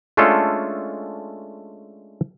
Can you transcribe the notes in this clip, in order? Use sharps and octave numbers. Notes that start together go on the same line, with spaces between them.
G#3 A3 C#4 D4 F4 A4